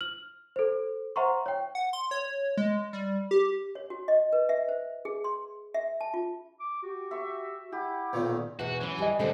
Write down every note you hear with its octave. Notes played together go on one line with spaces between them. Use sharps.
F6 F#7
A4 C5
C5 E5 F#5 A#5 C6 C#6
C#5 G5
F#5
C6
C#5
G#3
G3
G4
C#5
F#4
D#5
B4
E5
C5
G#4
C6
E5
A5
F4
D6
F#4 G4
E5 C#6
E4 G4 F#5
B1 A#2 D#3 F4 C#5
E2 B2 F#4
E3 F#3 C#4
G3 D#5 G#5
G2 D3 G3 C4